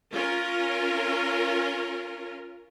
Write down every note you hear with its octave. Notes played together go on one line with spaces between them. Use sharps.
C#4 F4 A#4